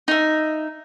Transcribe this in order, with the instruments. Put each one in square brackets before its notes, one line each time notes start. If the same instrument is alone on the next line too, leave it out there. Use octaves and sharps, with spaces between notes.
[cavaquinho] D#4 E5